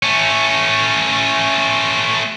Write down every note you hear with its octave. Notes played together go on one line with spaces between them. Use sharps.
A3 C#4